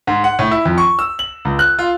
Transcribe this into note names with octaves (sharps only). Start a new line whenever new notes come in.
G#2
F#5
A2
E4
F2
C#6
E6
F#7
C#2
F#6
F4